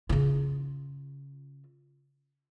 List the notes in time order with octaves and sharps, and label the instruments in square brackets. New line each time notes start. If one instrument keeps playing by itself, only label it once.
[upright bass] C#3 F4